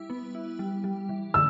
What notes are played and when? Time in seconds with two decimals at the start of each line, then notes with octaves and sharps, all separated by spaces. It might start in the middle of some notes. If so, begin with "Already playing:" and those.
Already playing: G3 E4
0.10 B3
0.35 E4
0.59 G3
0.84 G3
1.09 E3
1.34 D3 E6